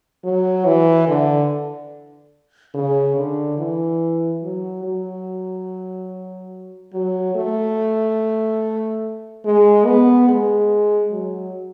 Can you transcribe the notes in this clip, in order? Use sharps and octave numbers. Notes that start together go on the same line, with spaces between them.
F#3
E3
D3
C#3
D3
E3
F#3
F#3
F#3
A3
G#3
B3
G#3
F#3